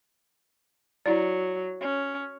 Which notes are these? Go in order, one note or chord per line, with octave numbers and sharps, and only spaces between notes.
F#3 E4 D5
C#4